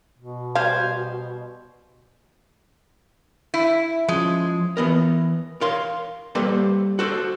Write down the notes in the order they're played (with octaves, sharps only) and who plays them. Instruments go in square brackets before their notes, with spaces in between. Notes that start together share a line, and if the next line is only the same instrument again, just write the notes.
[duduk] B2
[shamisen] G3 F5 [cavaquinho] C5 G#5
[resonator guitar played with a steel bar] E4
[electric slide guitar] F3 C#4 [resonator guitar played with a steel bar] G#3
[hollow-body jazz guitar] E3 B3 A#4
A#4 C#5 F5 C6
G3 A#3 A4 B4 C5
F#4 A4 C5